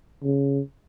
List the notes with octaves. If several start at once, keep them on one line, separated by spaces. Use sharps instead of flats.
C#3